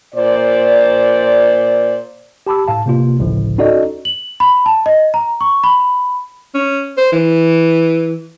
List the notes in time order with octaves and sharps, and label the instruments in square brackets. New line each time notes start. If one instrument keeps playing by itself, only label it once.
[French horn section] A#2 C5 D5
[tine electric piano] G4 A5 B5 D6 E6
A2 F5 A5
C3 A#3 F4
G#1 C#2 A2 D3 F3
C#4 D#4 F#4 A4 D5 D#5
[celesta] F#7
B5
A5
D#5
A#5
C#6
B5
[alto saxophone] C#4
C5
E3